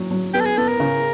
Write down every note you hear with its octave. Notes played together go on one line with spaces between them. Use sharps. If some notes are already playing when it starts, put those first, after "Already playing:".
Already playing: A#2 F#3
F#3
B3 G4
A4
G#4
B3 A4
A#4
C#3